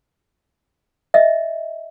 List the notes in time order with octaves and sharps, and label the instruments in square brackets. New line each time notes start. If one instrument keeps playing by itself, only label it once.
[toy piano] D#5 E5